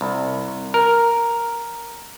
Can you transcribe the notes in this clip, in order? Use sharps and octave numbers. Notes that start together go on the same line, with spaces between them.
C2
A#4